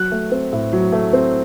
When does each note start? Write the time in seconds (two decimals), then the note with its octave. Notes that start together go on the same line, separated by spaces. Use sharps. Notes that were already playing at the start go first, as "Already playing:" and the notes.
Already playing: F#3 F#6
0.11 A3
0.32 C4
0.53 A2
0.73 F#3
0.93 A3
1.13 C4